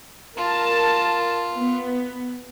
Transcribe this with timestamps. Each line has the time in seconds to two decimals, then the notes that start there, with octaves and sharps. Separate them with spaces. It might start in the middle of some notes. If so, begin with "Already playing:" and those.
0.37 F4 A#4 A5
1.58 B3